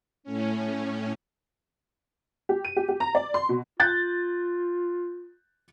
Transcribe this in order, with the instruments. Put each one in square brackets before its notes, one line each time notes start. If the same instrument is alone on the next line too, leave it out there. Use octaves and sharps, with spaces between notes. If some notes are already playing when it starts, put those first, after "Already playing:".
[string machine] A2 C#4
[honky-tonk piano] G4
D#7
G4
G4
A#5
D5
C6
B2
[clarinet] F4 [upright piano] F#6 G6 A6